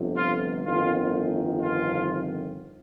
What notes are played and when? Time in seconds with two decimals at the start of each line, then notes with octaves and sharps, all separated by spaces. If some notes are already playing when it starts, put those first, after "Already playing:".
Already playing: G1 F2 C3
0.17 F4
0.65 G1 F2 D#3 F4
1.62 F4